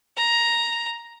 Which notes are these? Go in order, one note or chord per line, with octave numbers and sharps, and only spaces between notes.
A#5